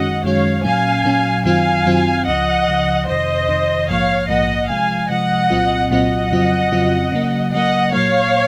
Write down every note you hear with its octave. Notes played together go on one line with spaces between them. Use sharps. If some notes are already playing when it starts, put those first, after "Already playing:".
Already playing: F#2 D#3 G#3 C#4 F#4 D#5 F#5
F#2 D#3 G#3 C#4 F#4 C#5 F5
A#2 F#3 C#4 F5 G#5
A#2 F#3 C#4
F#2 D#3 F#3 C4 F4 F5 G#5
F#2 D#3 F#3 C4 F4
C#2 C#3 F3 D#5 F#5
C#2 C#3 F3
F2 C3 D#3 C5 D#5
F2 C3 D#3
A#1 G#2 F3 A#3 C#5 F5
A#1 G#2 F3 A#3 D#5 F#5
C3 F3 G#3 F5 G#5
C3 F3 G#3 D#5 F#5
C2 A#2 F#3 C4 F4
C2 A#2 F#3 C4 F4 D#5 F#5
F2 C#3 F#3 C4 F4
F2 C#3 F#3 C4 F4
C#3 F#3 A#3
C#3 F#3 A#3 D#5 F#5
A#2 F#3 A#3 C#5 F5